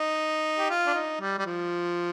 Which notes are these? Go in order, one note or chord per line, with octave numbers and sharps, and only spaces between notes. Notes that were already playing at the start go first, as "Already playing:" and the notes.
Already playing: D#4
G4
F4
D4
D#4
G3
G3
F3